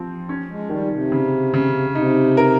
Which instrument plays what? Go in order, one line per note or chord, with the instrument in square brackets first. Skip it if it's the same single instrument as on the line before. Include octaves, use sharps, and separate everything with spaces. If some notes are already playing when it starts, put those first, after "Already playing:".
Already playing: [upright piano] F3 C4
C#4
[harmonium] G#3
[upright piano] D#3 [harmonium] G3
[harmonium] C3
[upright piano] C#3
C#3
[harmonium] C3 [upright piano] D#4
[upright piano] A#4